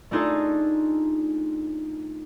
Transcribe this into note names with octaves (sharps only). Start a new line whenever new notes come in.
A3 D4 D#4 F4 G#4 A4